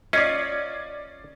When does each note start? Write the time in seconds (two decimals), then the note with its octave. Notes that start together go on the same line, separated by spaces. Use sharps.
0.13 C#4 F4 D5 D#5 G#6 C7